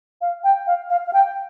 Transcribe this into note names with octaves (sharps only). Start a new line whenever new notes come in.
F5
G5
F5
F5
F5
G5